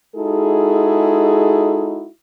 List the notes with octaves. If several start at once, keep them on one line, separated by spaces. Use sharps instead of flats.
G#3 D#4 E4 F#4 G#4 A4